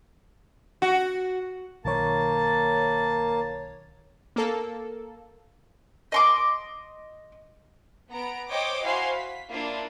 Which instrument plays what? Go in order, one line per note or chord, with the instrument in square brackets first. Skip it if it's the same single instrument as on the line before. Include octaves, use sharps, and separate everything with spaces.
[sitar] F#4
[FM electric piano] B1 D#3 C#5 [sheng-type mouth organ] A#3 A5
[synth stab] A#3 A4
[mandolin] D#5 C6 D6
[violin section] B3 A#5 D7
C5 C#5 D#5 G5 D6
E4 F#4 C5 F5 G#5 C6
B6
A#3 D4 E4 F4